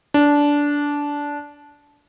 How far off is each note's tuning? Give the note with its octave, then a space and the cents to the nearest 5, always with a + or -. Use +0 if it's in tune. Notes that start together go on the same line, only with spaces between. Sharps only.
D4 -15